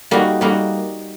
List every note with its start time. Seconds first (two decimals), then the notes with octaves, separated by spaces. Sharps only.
0.11 G3 A#3 D#4 F#4
0.41 G3 A#3 D#4 F#4